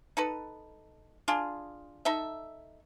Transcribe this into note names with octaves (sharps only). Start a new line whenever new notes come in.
D#4 A4 B4
D4 F4 G#4
D#4 A4 E5